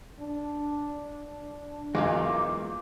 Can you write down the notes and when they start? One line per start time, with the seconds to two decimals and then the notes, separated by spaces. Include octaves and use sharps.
0.19 D4
1.95 B1 E2 G#3 A#3 D#4 F4 D6